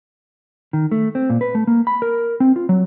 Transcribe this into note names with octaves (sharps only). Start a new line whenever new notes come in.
D#3
A3
C4
A#2
B4
A3
A#3
B5
A#4
C4
F4
F#3